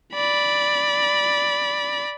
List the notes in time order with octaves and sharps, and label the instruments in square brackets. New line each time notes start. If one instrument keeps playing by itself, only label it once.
[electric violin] D5 B5